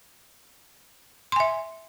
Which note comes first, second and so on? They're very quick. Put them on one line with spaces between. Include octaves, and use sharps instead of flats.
C6 G#5 E5